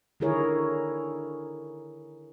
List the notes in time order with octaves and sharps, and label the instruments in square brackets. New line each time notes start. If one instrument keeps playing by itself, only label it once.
[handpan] D3 D#3 E4 G#4 A#4 C#5